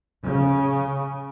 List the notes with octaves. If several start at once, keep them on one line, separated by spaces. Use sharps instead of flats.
C#3